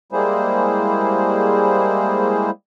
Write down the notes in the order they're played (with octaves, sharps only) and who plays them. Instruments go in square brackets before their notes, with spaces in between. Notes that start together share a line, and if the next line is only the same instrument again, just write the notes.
[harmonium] G3 G#3 A#3 E4 G#4 C5